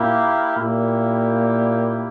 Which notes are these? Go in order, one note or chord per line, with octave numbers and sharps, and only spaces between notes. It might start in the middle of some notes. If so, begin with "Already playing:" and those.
Already playing: A#2 A#3 E4 G4 A#4 F5
A#2 A#3 E4 G4